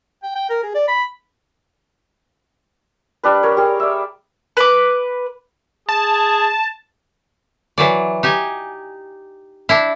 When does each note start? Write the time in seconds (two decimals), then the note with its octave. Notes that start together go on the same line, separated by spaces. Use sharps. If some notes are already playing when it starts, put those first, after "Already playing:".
0.23 G5
0.36 G5
0.50 A#4
0.63 G#4
0.75 D5
0.88 B5
3.23 G3 D4 B4
3.43 A#4 C#5
3.57 G3 G#4
3.80 D5 E5
4.57 B4 D6
5.89 G#4 A5
7.78 E3 F#3 D5
8.23 D#4 G4 G#5
9.69 D4 E4